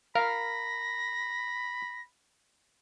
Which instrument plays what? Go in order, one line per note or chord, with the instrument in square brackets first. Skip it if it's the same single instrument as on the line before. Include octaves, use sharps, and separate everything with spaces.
[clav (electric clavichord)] A#4 [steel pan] F5 [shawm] B5 [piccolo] A#6